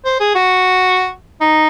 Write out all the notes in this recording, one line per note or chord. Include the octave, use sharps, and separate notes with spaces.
C5
G#4
F#4
D#4